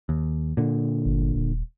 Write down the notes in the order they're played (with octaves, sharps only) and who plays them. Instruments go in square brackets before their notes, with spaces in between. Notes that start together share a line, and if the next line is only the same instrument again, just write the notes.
[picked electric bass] D#2
A#2 D3
[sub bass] G1
D#1